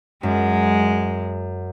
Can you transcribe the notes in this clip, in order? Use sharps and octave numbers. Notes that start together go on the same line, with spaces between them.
F#2 G#3